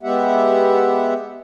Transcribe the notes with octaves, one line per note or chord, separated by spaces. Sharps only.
G#3 B3 G4 E5 F#5